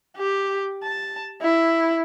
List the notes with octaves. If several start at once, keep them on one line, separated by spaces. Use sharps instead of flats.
G4
A5
E4